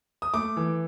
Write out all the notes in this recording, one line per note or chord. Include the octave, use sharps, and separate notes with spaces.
D#6
A3 D6
E3